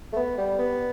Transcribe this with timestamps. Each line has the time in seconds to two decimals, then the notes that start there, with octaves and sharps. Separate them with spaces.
0.13 A3
0.16 B3
0.38 G3
0.59 B3